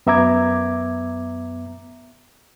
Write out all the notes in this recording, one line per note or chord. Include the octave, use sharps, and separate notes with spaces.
F#2 B3 E5 A#5 D6 G#6